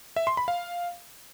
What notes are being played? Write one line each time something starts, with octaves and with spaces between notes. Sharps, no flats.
E5
C6
B5
F5